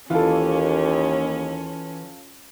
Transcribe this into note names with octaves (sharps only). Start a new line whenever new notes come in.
D#2 E3 C#4 F4 A4